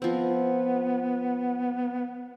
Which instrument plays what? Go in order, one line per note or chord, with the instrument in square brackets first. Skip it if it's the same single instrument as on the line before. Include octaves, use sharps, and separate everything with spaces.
[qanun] F3 C4 [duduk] B3